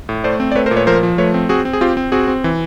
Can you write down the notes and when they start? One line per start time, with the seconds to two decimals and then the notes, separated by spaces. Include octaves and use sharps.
0.09 A2
0.24 A3 C5 D5
0.40 C4
0.52 D5
0.55 A3 B4 C#5
0.66 A#4 C5
0.71 A#2
0.76 B4 C#5
0.87 F3 A#4 C5
1.03 F3
1.18 A3 B4 C#5
1.34 C4
1.49 C4 F#4 G#4
1.65 C4
1.73 G#4
1.81 C4 F4 G4
1.97 C4
2.12 C4 F#4 G#4
2.28 C4
2.44 E3